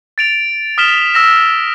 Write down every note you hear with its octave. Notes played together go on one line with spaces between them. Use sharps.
A6 D7 F7
D#6 F6 B6 E7 G7
E6 A#6 E7